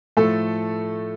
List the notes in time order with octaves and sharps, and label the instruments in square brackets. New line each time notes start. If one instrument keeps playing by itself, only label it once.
[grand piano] A2 F3 A3 A4